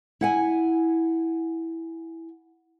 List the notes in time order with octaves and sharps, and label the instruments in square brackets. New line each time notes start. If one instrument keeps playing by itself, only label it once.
[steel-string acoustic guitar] E4 F#5 G#5